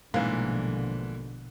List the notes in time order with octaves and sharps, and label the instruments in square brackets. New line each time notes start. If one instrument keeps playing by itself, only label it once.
[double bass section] A#1 F3 G3 [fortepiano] G#2 E3 [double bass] B2 D3 [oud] A#3